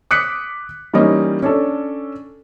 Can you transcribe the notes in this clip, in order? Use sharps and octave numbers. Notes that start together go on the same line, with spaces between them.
D6 D#6 F#6 B6 C#7
E3 G3 A#3 C#4 D#4
C#4 D4 A4